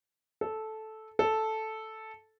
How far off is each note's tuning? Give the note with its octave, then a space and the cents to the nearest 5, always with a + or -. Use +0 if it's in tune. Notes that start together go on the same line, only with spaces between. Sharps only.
A4 -10
A4 -5